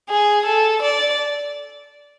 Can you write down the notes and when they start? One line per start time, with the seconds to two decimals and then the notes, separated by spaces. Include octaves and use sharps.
0.10 G#4
0.46 A4
0.82 D5